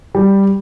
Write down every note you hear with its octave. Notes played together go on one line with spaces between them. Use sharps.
G3